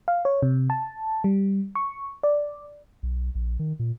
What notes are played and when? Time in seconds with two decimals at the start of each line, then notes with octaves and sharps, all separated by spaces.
0.08 F5
0.25 C#5
0.42 C3
0.70 A5
1.24 G3
1.75 C#6
2.23 D5
3.03 B1
3.35 A#1
3.59 D#3
3.79 A#2